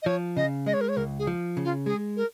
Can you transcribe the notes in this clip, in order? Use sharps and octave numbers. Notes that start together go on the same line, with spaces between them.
D#5
F3 C#5
C#3 D#5
G#3 D#5
C#5
A#4
C#5
C#2 A#4
G#4
F3
C#3
F4
G#3 G#4
A#4